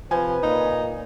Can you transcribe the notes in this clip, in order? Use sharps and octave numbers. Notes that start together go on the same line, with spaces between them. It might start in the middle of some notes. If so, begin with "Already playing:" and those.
C3 F3 B4 G#5
A#2 D#4